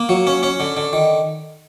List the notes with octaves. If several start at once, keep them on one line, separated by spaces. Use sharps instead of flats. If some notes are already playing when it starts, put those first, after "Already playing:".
Already playing: A#3
F#3
C#4
C#4
D3
D3
D#3